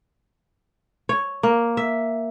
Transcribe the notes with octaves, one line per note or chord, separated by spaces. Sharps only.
C#5
A#3
E5